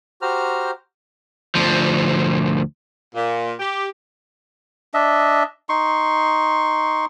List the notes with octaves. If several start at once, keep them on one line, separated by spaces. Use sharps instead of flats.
F#4 G4 C5 A#5 F6
D2 F3
A#2
G4
D4 D#5 E5
D#4 C6 C#6